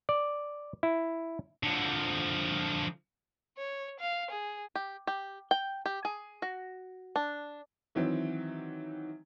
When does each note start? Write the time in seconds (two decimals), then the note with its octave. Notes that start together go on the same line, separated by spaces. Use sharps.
0.09 D5
0.83 E4
1.63 D3 F3
3.58 C#5
4.00 F5
4.31 G#4
4.75 G4
5.07 G4
5.51 G5
5.86 G4
6.05 G#4
6.42 F#4
7.16 D4
7.95 D#3 E3 F#3 C4